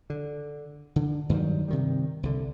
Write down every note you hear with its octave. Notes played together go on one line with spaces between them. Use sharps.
D3
D3
G2 D#3 F#3 G3
C3 D#3 G3
C2 D3